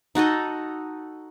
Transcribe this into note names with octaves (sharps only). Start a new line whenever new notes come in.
D#4 F#4 A4 D#5